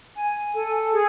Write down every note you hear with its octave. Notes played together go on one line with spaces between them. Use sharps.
G#5
A4
G#4